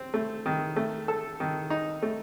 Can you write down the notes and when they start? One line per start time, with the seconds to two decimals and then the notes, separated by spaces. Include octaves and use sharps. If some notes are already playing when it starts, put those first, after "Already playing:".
Already playing: C4
0.14 A3
0.46 D#3
0.76 A3
1.08 A4
1.40 D#3
1.70 D#4
2.02 A3